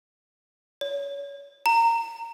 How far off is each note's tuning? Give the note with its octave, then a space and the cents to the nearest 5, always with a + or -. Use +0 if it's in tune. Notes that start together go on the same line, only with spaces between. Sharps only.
C#5 +30
A#5 -15